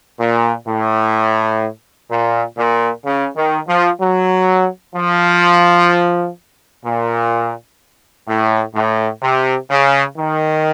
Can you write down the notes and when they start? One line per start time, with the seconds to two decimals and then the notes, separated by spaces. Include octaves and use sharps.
0.20 A#2
0.68 A2
2.11 A#2
2.58 A#2
3.05 C#3
3.37 D#3
3.68 F3
4.01 F#3
4.95 F3
6.85 A#2
8.28 A2
8.75 A2
9.23 C3
9.70 C#3
10.18 D#3